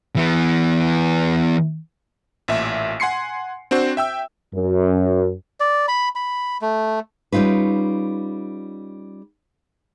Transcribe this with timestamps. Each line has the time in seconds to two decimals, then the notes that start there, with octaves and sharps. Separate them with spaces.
0.16 E3 B3
2.48 A1 A#2 E5
3.00 F#5 G#5 C6 C7 C#7
3.71 C4 D4 F#4 C5
3.97 E5 G5 E6
4.54 F#2
5.60 D5
5.88 B5
6.15 B5
6.61 A3
7.32 G3 C#4 D#4 F4 B4